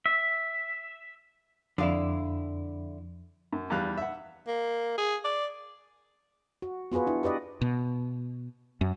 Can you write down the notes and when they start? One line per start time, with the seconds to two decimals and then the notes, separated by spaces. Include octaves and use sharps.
0.06 E5
1.78 F2 D3 E4 G#4 D5 F5
3.53 F#2
3.70 E2 G3 F5 F#6
3.98 E5 F#5
4.47 A#3
4.98 G#4
5.24 D5
6.62 F#4
6.92 B3 F4 F#4 G#4 B4
7.07 D4 E4
7.23 G4 B4 D5 D#5
7.61 B2
8.81 F#2